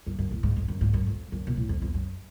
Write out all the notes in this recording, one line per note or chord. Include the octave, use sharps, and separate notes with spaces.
F#2
F#2
A2
G#2
F2
F#2
G#2
F#2
F2
F#2
B2
A2
F2
F2
F#2